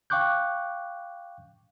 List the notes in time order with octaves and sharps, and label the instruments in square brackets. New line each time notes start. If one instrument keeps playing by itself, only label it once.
[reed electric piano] F5 G5 C#6 D6 F#6 G6